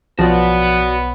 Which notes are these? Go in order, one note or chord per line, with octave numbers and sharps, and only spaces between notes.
B1 F3 B3 F#4 C#5 D5